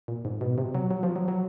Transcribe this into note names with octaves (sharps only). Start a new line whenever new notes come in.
A#2
G#2
B2
C3
F#3
F#3
F3
F#3
F#3